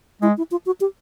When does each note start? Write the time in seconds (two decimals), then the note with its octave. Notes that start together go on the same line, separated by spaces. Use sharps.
0.22 G#3 E4
0.37 E4
0.51 F4
0.66 F#4
0.81 G4